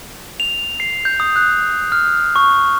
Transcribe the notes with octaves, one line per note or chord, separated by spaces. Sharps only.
F7
C7
G6
D#6
F#6
F6
C#6